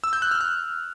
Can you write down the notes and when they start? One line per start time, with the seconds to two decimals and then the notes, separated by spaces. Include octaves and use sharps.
0.04 E6
0.13 G6
0.22 F#6
0.31 F6
0.41 F#6